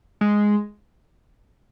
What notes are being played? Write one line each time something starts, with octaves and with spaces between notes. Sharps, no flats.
G#3